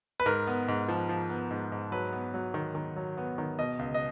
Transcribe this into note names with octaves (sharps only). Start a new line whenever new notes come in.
B4
G#2 A#4
B3
G#2
F3
F3
B3
G#2
G#2
F#3 B4
B3
F#3
D#3
D#3
F#3
B3
D#3
B2 D#5
C#2
D#5